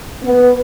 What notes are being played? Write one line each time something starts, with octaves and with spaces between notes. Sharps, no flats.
B3